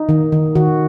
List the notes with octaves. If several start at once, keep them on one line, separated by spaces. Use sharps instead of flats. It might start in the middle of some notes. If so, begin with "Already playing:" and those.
Already playing: D#4
D#3
D#3
D#3 F#4